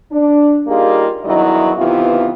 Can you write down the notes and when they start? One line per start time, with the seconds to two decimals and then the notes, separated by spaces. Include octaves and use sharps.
0.12 D4
0.68 G3 A#3 D#4 F4 G4 G#4
1.24 E2 G2 D#3 F#3 E4 D#5
1.77 C3 D#3 E3 B3 F4